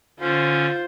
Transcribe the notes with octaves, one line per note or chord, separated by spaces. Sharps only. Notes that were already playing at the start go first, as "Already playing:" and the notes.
D3 C#4 F4 C5